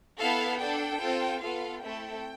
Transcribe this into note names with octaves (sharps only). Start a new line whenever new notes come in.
B3 E4 A4 F5
D4 A4 G5
C4 F4 A4
B3 F4 A4 F5
A3 C4 E4 A4 G5